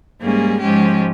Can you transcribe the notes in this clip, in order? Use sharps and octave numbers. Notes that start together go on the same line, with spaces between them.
G#2 G3 A#3 C#4 G#4
G#2 F3 G#3 C#4 G4